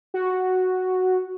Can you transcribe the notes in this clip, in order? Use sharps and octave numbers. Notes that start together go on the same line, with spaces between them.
F#4